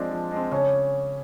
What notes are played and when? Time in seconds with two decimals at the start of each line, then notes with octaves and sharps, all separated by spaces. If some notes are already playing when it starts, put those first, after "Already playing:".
Already playing: F3 G#3 C4 D4
0.11 F3
0.32 G#3 C4
0.51 C#3 C#4